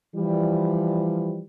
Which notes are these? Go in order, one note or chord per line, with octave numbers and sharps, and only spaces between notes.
E3 F3 G3